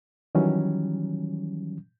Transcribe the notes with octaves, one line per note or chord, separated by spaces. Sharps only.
D#3 E3 F#3 G3 C#4